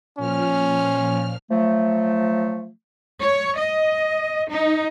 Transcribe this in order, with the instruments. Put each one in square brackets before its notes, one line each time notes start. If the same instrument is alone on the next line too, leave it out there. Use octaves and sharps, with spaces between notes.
[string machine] A#2 F3 F6 [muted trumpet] C#4
[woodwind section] F3 F#3 A3
[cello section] C#5
D#5
D#4